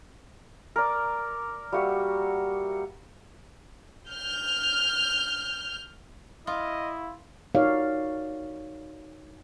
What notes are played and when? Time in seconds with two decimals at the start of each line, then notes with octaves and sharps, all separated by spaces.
0.76 A#4 D5
1.72 G3 A#3 F#4 E5
4.09 F6 G6
6.47 E4 F4 D#5
7.55 D#4 F#4 A#4 C#5 D5 F5